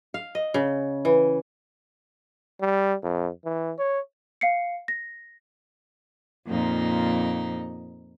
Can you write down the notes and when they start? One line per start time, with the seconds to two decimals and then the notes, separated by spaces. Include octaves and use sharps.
0.14 F5
0.35 D#5
0.54 C#3
1.05 E3
2.61 G3
3.03 F2
3.45 E3
3.79 C#5
4.41 F5 C7 C#7
4.88 A#6
6.47 F2 A#2 D#4